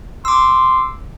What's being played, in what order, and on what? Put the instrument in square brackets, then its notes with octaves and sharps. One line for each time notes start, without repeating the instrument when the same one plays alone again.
[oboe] C6 [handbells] D6 E6